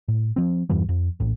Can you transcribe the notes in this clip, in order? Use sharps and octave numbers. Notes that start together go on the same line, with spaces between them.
A2
F3 C4
E2 G2 E3 G3
F2
A#1 A2